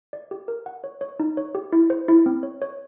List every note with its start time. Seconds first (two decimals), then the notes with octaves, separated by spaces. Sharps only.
0.13 D5
0.31 G4
0.48 A#4
0.66 F#5
0.84 C#5
1.01 C#5
1.20 D#4
1.37 C#5
1.55 G4
1.73 E4
1.90 C5
2.08 E4
2.26 C4
2.43 C#5
2.62 C#5